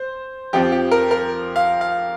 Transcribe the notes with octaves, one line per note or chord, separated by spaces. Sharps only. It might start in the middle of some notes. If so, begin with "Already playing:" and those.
Already playing: C5
F2 F3 C4 G4
G4
A#4
A#4
F5
F5